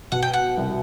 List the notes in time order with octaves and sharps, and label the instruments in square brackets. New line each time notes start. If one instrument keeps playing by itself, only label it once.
[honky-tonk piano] B2 [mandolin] F#5
[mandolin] G5
F#5
[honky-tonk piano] C2